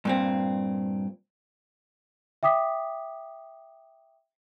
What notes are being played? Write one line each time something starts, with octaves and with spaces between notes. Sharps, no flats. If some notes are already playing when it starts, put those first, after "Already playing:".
G2 A#2 C4
E5 G5 D6 D#6 B6